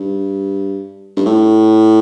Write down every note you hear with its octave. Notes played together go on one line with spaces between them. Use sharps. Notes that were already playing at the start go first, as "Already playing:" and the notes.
Already playing: G2
G2
A2